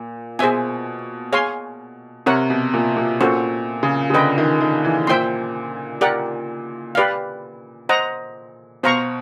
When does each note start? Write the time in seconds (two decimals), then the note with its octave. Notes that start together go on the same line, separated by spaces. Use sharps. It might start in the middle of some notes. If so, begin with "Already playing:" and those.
Already playing: A#2
0.39 B2 G#4 C5 E5 G#5
1.32 G#4 C#5 F5 G#5 C6
2.26 C3 A#4 C#5 F#5
2.50 B2
2.74 A#2
2.97 A#2
3.21 A#2 C#4 F#4 A4 C5
3.83 C#3
4.10 C#3
4.14 D3 B4 D#5 G5
4.38 D#3
4.61 D#3
4.85 E3
5.07 A#2 C5 E5 G5 C6
6.01 G4 A#4 D5 F#5
6.95 G4 B4 D5 F5
7.89 C5 D#5 F#5 A#5
8.83 B2 C5 F5 A#5 C#6